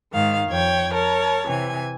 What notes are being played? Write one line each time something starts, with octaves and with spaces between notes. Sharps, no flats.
G#2 D#3 F5
F2 C#5 G5 G#6
A#4 C#5 A5
C3 E3 G#5